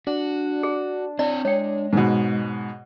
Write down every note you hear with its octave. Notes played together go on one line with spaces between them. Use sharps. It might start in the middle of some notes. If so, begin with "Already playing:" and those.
D4 F#4
G#4
C4 E4 C#5 D5
G#3 C#5 G5
G#2 B2